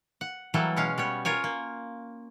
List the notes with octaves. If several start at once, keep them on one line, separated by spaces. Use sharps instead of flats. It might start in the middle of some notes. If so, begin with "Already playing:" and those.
F#5
E3 F#3 G3 A#3 A4
B2 G#3 C#4 F5
G3 B3 C#5
F4 A#4 C#5 G#5
A#3